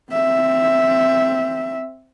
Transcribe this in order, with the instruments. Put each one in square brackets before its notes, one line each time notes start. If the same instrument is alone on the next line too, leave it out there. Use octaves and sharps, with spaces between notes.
[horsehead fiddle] C4 E5